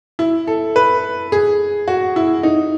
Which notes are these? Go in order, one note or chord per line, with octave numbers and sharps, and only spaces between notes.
E4
A4
B4
G#4
F#4
E4
D#4